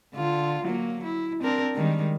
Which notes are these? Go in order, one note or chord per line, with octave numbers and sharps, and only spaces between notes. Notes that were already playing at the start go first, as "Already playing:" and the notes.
D3 F4
F#3 A#3
E4
C4 D4 A#4
D#3 G3 G#3